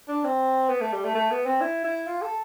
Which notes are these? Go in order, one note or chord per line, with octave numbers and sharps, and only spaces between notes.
D4
C4
B3
A3
G3
A3
A3
B3
C4
E4
E4
F4
A4